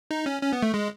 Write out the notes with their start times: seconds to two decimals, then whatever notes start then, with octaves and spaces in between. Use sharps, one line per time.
0.11 D#4
0.26 C#4
0.42 C#4
0.53 B3
0.63 A3
0.74 G#3